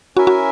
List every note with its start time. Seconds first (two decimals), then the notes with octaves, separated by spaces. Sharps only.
0.16 C#4 E4 F#4 A#4 E5 G#5
0.27 F#4